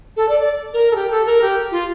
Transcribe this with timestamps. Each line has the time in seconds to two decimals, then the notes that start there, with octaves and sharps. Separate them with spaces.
0.17 A4
0.29 D5
0.40 D5
0.73 A#4
0.91 A4
0.96 G4
1.11 A4
1.26 A#4
1.42 G4
1.71 F4